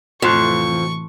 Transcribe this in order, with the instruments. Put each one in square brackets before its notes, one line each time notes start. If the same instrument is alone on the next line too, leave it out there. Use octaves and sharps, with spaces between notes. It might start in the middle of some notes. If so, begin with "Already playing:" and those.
[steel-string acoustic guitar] F2 [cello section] A2 C3 E3 [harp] A5 C6 F#6 [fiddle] C#6